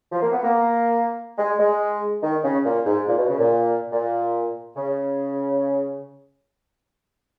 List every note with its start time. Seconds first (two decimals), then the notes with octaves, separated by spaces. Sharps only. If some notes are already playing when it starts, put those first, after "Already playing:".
0.12 F3
0.22 A#3
0.32 B3
0.43 A#3
1.38 G#3
1.59 G#3
2.23 D#3
2.44 C#3
2.65 A#2
2.86 G#2
3.07 A#2
3.18 B2
3.29 C#3
3.39 A#2
3.92 A#2
4.76 C#3